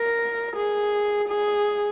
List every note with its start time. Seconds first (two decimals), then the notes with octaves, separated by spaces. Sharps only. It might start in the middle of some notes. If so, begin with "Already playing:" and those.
Already playing: A#4
0.56 G#4
1.29 G#4